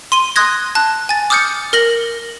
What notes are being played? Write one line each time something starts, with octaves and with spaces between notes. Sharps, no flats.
C6 D#7 G7
C6 D#6 F#6 G#6 A#6
A5 F#6
G#5 A6
D6 D#6 F6 G6 A6 C#7
A#4 F6 A#6 F#7